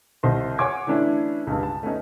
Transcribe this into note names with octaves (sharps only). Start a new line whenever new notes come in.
C2 C5 D#5 C6
C#5 F#5 G#5 C6 D6 G#6
E3 A3 C#4 D4 E4
C#2 G2
A5
A3 B3 C#4 D#4